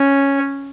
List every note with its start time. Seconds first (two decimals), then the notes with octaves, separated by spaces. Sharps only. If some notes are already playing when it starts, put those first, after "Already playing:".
Already playing: C#4